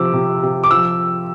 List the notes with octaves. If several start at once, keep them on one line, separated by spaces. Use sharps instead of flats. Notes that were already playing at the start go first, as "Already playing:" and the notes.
Already playing: C3 F3 D6 E6
C3
C3
D6
F3 E6